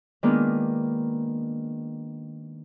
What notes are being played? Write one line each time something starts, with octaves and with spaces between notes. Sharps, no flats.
D#3 G#3 A#3 B3 D4 F4